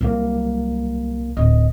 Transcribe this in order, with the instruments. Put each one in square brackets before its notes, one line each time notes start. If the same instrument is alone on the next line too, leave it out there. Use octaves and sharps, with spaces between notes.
[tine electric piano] C2 A#3 [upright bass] F#3 G3
[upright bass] D1 [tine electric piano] D#5